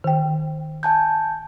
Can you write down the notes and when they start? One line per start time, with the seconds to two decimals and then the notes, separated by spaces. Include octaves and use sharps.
0.04 D#3 G5
0.83 G#5 A5 G6